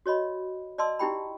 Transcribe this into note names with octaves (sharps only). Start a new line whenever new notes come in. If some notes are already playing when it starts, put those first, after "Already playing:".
F#4 C#5 D#5 B5
D5 D#5 A5 C6 E6
D#4 E4 G4 G5 B5